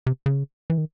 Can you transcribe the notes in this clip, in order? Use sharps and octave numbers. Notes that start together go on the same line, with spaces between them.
C3
C#3
E3
D#3